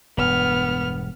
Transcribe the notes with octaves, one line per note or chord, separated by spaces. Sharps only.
E1 G2 B3 F6